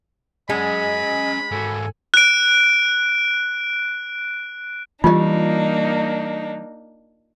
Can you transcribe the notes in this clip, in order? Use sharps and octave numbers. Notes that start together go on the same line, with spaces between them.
G#3 C#4 D#5 F#5 G#5 B5
G#2 F#4 A4 G#5
F#6 D7
E3 G3 A#3 D4 D#4 F4 G4